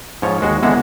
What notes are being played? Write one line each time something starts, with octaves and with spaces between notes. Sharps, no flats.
G#2 F3 C#5
D#2 G#3 F#4
D3 E3 G#3 B3 E5 F#5